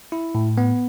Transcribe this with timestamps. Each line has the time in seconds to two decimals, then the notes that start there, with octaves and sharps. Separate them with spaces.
0.12 E4
0.35 A2
0.58 B3